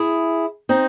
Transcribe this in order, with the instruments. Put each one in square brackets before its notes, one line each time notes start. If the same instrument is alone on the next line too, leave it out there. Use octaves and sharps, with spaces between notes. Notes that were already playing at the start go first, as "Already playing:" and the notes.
Already playing: [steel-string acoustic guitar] E4 G#4
C4 D#4